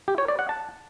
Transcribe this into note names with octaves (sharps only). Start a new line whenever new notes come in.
G4
C#5
D5
F#5
A5